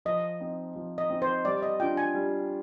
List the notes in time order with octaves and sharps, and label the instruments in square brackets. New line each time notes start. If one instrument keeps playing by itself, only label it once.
[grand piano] F3 [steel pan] D#5
[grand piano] C4 D#4
F3
[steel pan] D#5
[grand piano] C4 D#4
[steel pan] C5
[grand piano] G3 [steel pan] D5
[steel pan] D#5
[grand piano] D4 F4 [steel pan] G5
[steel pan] G#5
[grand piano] G3